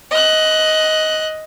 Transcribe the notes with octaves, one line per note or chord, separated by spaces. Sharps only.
D#5 F#6